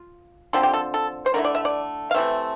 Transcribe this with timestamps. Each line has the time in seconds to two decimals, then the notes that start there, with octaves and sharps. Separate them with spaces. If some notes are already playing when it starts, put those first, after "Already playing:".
Already playing: F4
0.53 D3 F3 C4 A4
0.63 G4
0.74 A4
0.94 A4
1.26 C5
1.34 D3 A3 E4 A#4
1.45 D5
1.55 E5
1.65 D5
2.11 F5
2.14 C3 E3 A3 C4 E5